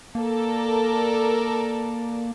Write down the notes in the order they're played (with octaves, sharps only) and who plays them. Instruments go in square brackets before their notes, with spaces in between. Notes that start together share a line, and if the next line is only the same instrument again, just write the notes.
[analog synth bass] A#3 [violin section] A4 A#4 D5